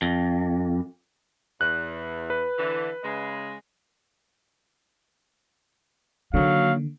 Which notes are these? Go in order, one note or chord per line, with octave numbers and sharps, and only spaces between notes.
F2
E2 F#6
B4
D3 E3
C#3 G#3
D3 D#3 F#3 A#3 F5